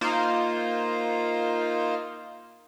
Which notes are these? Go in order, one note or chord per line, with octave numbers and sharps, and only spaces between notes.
A#3 D#4 F4 C5